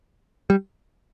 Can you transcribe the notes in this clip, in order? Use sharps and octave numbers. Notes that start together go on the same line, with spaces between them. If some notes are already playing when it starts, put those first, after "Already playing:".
G3